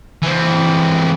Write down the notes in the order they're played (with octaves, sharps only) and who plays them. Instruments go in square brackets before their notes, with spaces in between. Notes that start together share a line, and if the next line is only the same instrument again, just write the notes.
[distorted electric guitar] E3 C4